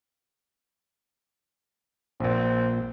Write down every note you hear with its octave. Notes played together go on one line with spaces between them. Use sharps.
A#1 A#2 C4